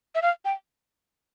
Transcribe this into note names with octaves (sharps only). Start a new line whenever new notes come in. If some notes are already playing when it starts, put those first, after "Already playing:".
E5
F5
G5